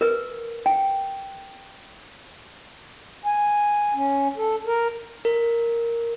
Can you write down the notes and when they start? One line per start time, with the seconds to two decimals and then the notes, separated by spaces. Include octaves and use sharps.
0.01 A#4 B4
0.66 G5
3.25 G#5
3.94 C#4
4.37 A4
4.67 A#4
5.25 A#4